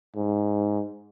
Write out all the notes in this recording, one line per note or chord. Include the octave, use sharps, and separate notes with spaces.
G#2